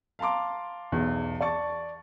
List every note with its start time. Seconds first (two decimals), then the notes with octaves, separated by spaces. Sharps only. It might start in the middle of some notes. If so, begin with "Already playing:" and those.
0.19 F5 A5 A#5 C6 D6
0.92 B1 E2
1.41 D5 A5 C#6 A6